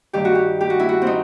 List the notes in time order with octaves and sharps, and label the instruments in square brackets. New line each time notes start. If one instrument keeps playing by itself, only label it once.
[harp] G2 D#3 G4
F#4
G4
G4
F#4
E4
F#4
C4
D#4